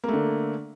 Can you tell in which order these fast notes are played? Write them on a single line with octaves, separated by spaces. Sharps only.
A#3 A3 D3